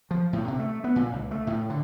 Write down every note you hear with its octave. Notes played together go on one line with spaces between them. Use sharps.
F3
A2
C3
A3
B3
A#2
C#2
A3
A2
D3